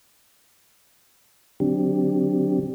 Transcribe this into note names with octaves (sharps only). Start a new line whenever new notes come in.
D3 F#3 C4 D4 G4